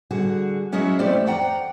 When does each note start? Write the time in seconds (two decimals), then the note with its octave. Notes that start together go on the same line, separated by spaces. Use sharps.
0.11 D3 G3 F#4 G#4
0.72 F#3 C#4 E4 F#4 G#4 D#5
0.99 F3 A3 C4 E4 G4 D5
1.26 F2 D5 F#5 G5 A#5